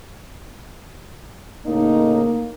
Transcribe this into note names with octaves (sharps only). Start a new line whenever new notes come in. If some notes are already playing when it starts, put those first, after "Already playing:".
A2 C#3 A#3 D#4